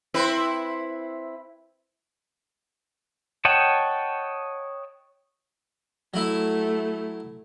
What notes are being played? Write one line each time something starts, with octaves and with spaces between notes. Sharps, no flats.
C4 E4 B4
C#5 D#5 F#5 G5 A5
F#3 A3 E4